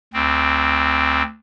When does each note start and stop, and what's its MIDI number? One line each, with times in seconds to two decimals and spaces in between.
0.13 1.22 38
0.13 1.22 60